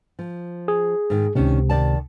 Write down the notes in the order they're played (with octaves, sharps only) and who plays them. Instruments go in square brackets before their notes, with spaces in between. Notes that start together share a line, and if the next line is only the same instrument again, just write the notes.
[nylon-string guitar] F3
[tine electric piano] G#4
[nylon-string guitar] G#2 D#3
[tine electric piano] C#2 C3 [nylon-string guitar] D#3 C#4 D4
[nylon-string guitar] D#3 D5 A5